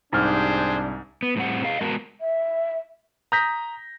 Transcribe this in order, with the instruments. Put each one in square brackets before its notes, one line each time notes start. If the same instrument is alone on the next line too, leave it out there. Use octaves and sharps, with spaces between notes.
[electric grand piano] C2 [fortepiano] G#2 F6 [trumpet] D4 [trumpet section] G4 G#4 C5
[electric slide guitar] B3
A2 G3 C4 F#5
G#4 D#5 F5
G#3 B3 F#4 A#4 A5
[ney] E5
[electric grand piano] A#5 D#6 G6 A#6 B6